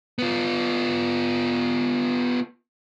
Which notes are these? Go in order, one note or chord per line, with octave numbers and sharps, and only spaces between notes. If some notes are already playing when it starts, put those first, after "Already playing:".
B3 F4